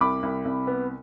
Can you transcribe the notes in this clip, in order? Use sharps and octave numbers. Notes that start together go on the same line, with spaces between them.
C2 B5 D6
C2
C2
B3